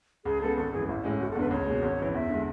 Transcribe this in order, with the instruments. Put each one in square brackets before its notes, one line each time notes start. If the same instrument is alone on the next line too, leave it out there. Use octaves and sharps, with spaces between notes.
[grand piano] C#2 [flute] G#4
[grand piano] C#3 G#3 B3 [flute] A4
[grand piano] G#1 [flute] A4
[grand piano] F#2 E3 [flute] G#4
[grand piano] A1 [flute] E4
[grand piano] A2 G#3 C#4
[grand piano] F#1 [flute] F#4
[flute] A4
[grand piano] E2 D3 [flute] B4
[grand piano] C#2 [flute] C#5
[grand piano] B2 G#3
G#1
F#2 E3
[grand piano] E2 [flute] E5
[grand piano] D3 G#3